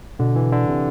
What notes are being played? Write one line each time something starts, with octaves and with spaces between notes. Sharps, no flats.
B2 D3
E3
D3
C3